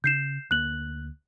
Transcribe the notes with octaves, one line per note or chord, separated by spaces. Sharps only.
C#3 G6 C7 E7
D2 A#3 F#6 F#7